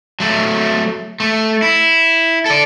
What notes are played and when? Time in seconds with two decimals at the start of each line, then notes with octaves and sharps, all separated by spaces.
0.20 F#3 A3
1.20 A3
1.62 E4
2.46 A4 D5